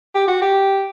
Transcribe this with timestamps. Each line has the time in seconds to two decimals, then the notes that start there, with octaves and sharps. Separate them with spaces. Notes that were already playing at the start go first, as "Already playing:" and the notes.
0.15 G4
0.28 F#4
0.42 G4